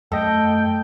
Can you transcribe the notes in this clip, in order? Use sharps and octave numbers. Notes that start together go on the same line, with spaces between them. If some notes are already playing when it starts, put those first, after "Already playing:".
F#2 A3 A4 D#5 G5